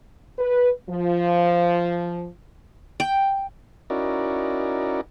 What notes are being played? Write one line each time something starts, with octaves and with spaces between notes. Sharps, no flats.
B4
F3
G5
C#4 D#4 E4 F#4 A#4 D5